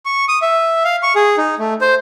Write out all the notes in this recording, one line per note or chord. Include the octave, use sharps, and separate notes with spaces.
C#6
D#6
E5
F5
C#6
G#4
D#4
A3
C5